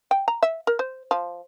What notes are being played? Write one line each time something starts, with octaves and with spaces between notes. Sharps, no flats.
G5
A#5
E5
A#4
C5
F3